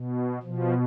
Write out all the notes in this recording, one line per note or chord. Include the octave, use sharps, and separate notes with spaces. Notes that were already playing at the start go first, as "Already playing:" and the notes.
Already playing: B2
B2 F3